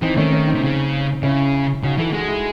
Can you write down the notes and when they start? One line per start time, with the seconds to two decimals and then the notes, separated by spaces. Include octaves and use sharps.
0.02 E3 C4 D#4
0.17 D#3 A3 C#4
0.32 A3 C#4
0.47 C4 D#4
0.54 C3
0.63 C#3
1.23 C#3 C#4 E4
1.83 C#3 D#4 F#4
1.98 E3 F#4 A4
2.13 G#3 F#4 A4
2.28 E4 G#4